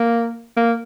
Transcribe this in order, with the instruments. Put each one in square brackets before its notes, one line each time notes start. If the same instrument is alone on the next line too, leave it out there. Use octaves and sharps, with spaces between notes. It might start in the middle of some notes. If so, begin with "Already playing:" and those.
Already playing: [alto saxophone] A#3
A#3